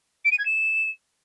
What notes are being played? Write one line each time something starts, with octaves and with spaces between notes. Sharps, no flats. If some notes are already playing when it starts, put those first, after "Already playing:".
D7
D#7
G#6
E7